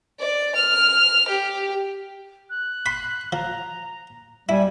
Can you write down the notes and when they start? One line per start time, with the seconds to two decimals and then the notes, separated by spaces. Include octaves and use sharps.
0.19 D5
0.55 F6
1.28 G4
2.50 F#6
2.86 B5 C6
3.32 F3 A#5
4.49 G3 E4 G#5